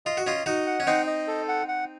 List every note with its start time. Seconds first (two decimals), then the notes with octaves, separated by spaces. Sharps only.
0.06 F4 D#5
0.17 F#4
0.27 C#4 F4 D#5
0.46 D#4 F#4 D#5
0.67 F#5
0.80 C#4
0.87 C4 D#4 D#5
1.07 D#5
1.28 A4
1.48 F#5
1.68 F#5